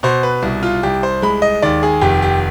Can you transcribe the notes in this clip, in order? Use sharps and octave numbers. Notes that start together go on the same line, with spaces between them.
B2 C5
B4
C2
F4
C2 G4
C5
G#3 B5
D#5
D#2 D5
G#4
F1 G4
G4